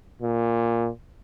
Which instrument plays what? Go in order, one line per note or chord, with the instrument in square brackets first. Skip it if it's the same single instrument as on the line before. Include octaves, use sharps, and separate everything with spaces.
[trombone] A#2